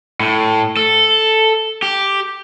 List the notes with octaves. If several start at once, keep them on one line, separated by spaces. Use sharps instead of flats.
A2
A4
G4